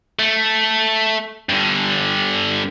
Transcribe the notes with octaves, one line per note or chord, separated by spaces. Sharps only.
A3
G2 D3